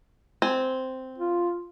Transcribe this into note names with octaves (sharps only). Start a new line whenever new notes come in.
C4 G#5
F4